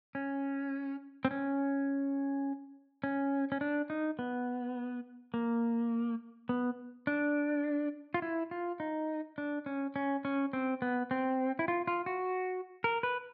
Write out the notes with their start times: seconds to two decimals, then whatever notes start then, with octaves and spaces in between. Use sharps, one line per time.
0.15 C#4
1.25 C4
1.31 C#4
3.04 C#4
3.52 C#4
3.61 D4
3.90 D#4
4.19 B3
5.34 A#3
6.49 B3
7.07 D4
8.14 F4
8.22 E4
8.51 F4
8.80 D#4
9.38 D4
9.66 C#4
9.96 C#4
10.25 C#4
10.53 C4
10.82 B3
11.11 C4
11.59 E4
11.68 F4
11.87 F4
12.06 F#4
12.84 A#4
13.03 B4